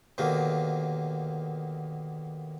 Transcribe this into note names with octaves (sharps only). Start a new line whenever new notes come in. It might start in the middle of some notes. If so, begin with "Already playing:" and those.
D#2 B2 D3 A#3